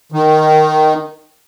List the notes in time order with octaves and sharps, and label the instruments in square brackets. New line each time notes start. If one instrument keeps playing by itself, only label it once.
[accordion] D#3